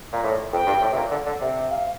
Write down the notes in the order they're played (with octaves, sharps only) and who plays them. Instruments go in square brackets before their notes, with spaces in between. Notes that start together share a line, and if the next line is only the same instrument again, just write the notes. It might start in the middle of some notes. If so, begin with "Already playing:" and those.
[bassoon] A#2
A2
[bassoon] F2 [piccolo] G5
[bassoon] G2
A2
C3
A#2
D3
D3
C3
[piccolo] F5
F5